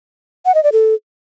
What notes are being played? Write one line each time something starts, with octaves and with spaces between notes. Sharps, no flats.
F#5
D#5
D5
A4